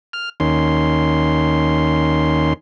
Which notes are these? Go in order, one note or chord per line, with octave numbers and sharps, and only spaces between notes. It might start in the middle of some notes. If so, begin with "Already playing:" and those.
F6
D#2 D#3 C#4 C6